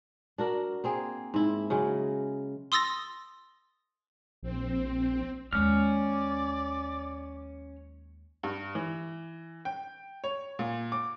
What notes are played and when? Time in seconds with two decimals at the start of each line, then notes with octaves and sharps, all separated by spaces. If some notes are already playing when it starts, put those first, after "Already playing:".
0.38 D4 F#4 A#4
0.84 A#3 C4 G#4
1.34 G#2 E4
1.70 C#3 F#3 G#3
2.72 C6 D#6 E6 A6 A#6
4.43 A#1 C4
5.53 D#2 G#3 C#4 D5 F6
8.43 G2
8.75 E3
9.65 G5
10.24 C#5
10.59 A#2
10.92 D6